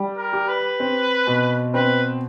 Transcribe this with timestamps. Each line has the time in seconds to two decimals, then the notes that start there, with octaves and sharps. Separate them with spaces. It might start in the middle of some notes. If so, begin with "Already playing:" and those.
Already playing: G3
0.17 A#4
0.33 G4
0.48 B4
0.80 C4
1.27 B2
1.74 C4 B4